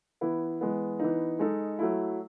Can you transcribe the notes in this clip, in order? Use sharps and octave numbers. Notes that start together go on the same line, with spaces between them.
E3 B3 E4
E3 G#3 B3
E3 B3 D#4
G#3 D#4 A4
F#3 A3 E4